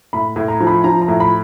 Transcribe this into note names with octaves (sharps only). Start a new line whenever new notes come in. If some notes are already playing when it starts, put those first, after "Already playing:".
A2 B5
A2
A#5
F3
B5
F3 A#5
A#5
A2
B5